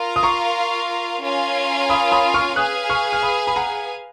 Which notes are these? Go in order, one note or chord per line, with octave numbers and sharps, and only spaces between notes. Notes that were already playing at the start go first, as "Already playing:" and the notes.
Already playing: F4 A#4 F5
D#6
A#5 C#6
C#4 F4 A#4 F5 G#5
B5 D#6
B5 D#6
C#6 F6
G#4 B4 F5 G#5 D#6 F#6
C#6 F6
F6
B5 D#6
B5
F#5 A#5